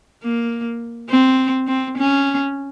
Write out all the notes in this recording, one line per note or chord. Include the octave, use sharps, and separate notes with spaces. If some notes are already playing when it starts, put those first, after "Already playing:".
A#3
C4
C4
C#4